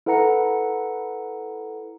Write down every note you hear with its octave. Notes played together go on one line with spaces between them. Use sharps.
E4 A4 B4 F#5 A#5 C#7